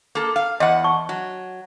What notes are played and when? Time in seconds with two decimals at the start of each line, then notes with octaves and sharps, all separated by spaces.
0.15 A#3 A4
0.36 F5
0.60 E2 D#5 F#5
0.84 A5 C#6
1.09 F#3